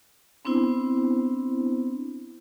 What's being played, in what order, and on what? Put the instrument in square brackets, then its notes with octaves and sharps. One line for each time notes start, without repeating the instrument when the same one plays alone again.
[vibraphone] B3 C4 D4 E4 C5